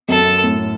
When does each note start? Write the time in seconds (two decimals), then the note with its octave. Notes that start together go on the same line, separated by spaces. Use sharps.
0.09 F#2 A4
0.44 A2